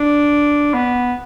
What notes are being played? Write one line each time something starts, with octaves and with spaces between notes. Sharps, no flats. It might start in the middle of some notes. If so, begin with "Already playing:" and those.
Already playing: D4
B3